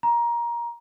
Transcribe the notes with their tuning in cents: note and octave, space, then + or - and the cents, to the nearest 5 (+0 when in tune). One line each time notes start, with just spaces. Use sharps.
A#5 +20